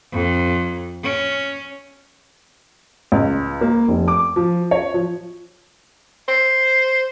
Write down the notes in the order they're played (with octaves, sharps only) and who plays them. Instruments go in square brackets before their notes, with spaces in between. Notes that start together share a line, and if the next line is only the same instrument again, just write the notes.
[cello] F2
C#4
[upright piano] C#2
A#3
F1
D6
F3
C#5
F3
[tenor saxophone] C5